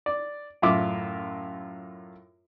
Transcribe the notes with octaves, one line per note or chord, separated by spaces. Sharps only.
D5
F#2 A2 F4 E5 D6